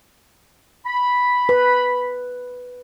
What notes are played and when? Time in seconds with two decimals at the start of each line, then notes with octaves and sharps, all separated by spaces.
0.85 B5
1.49 B4